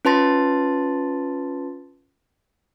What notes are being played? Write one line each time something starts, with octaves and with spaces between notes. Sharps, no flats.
C#4 F4 B4 A5 C6 A6